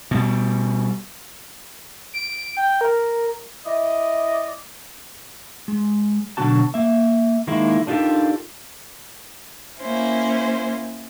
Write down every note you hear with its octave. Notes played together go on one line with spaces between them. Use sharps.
B2 G3
D7
G5
A#4
E4 D5 D#5
G#3
B2 D3 F#3 C4 F#4 A5
A#3 E5
D#3 G#3 A#3 E4
D4 D#4 F4 G4 A4 A#4
A#3 C#4 E4 C5